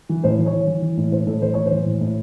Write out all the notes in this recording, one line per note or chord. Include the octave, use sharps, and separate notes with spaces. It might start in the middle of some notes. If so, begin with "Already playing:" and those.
E3
A2 C5
E3
C#5
E3
E3
E3
A2
A2 C5
A2 A4
E3 C5
A2 C#5
C5
E3
A2
A2